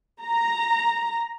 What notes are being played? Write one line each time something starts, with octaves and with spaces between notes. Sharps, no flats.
A#5